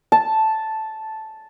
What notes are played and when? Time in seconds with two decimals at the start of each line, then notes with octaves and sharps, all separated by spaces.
0.12 A5